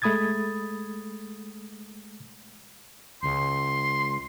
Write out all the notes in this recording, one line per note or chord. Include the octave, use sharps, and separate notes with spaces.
G#3 A3 B5 D#6 G#6 A6
C#2 C6